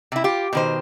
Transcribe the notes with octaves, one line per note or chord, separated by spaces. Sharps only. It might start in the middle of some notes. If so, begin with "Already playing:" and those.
C3 E4
F4 G4
B2 D#3 C5